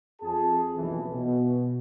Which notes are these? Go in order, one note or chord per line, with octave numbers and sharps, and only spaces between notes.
F2 G#4 A5
F#1 B1 F2 E3
B2